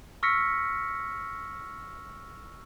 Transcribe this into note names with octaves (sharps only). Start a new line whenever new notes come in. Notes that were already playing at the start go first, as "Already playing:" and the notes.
C#6 E6 F6 A#6 B6 C#7